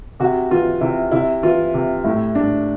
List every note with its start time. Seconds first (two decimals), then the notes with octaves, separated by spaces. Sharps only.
0.20 C3 F#4
0.51 E3 F4
0.81 C3 E4
1.11 C3 E4
1.43 E3 F4
1.74 C3
2.04 A2 E4
2.35 A2 D4